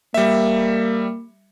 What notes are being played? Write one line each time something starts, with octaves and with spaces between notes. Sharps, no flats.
G3 A#3 E5